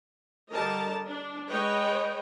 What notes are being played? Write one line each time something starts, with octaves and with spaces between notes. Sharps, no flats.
D3 G3 A#4 D#5 A5
D4
G#3 B4 C#5 D#5 G5